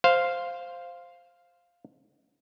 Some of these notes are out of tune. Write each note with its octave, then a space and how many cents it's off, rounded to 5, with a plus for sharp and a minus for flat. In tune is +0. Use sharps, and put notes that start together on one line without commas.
C5 +0 F5 +0